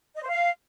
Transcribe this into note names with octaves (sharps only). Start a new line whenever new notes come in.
D#5
C5
F5